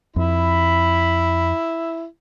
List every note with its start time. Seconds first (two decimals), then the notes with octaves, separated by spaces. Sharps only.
0.16 F2 E4 B5